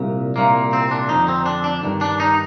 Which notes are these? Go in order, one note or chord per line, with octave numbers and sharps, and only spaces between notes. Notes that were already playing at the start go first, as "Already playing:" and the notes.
Already playing: C2 A#2
C2 A#2 A#3
C4
D4
F2 D3 D#4
C4
D4
D4
G2 D#3
D4
D#4